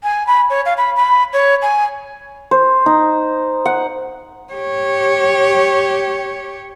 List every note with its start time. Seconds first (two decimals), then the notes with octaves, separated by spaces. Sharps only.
0.03 G#5
0.27 B5
0.50 C#5
0.66 F5
0.77 B5
0.96 B5
1.33 C#5
1.62 G#5
2.51 C5
2.86 D#4
3.66 F#5
4.53 G4 C#5